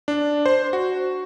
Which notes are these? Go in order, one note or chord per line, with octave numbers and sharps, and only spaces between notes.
D4
C5
F#4